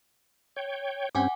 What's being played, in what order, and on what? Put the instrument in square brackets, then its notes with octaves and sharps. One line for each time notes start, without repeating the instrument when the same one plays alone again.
[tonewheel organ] C#5 G5
[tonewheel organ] G2 C4 C#4 [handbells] F#5 G#5 D6